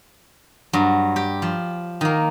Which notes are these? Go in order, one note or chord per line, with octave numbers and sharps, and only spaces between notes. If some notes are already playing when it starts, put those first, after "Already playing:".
G2 F#3
G4
F3
D#3 A#3